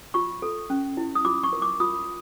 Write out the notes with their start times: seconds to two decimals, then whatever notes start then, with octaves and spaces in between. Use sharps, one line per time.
0.14 F4 C#6
0.42 A4
0.70 C#4
0.97 E4
1.15 D#6
1.25 F4 D6
1.44 C#6
1.53 A#4
1.62 D6
1.80 F4 D#6